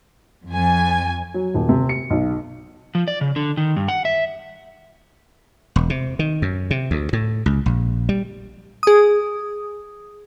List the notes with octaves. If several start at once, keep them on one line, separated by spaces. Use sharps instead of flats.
F2 G#5
F#3
D#1
C3
C#7
B1
F3
D5
C#3
D3
D#3
G2
F#5
E5
E1
C3
D#3
F#2
C3
D2
A2
C#2
A#1
G3
G#4 D#6